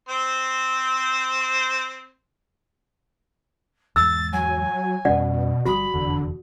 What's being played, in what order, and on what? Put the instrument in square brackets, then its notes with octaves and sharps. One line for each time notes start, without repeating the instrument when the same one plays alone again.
[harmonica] C4 C5
[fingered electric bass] E2 G#2 [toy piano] E6 [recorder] A6
[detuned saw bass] F#3 [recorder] G#5
[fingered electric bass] F2 G3 C#4 [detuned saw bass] B2 [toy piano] D5 F#5
[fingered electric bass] G1 F3 G3 [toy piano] F#4 D#6 [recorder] B5
[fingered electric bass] F1 E2 [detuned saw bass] D3